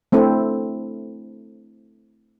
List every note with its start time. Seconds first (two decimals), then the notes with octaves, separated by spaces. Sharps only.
0.12 A3 C4 D4 E4 A4